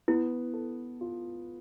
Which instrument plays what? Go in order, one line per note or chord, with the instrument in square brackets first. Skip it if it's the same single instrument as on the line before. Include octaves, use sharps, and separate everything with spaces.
[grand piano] B3 [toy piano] E4
[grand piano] A4
F4